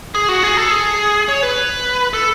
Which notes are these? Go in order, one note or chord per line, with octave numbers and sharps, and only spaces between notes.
G#4
F#4
G#4
A4
G#4
C#5
B4
A4